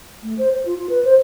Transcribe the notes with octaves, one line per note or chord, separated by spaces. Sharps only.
A3
C5
C5
F4
F4
B4
C5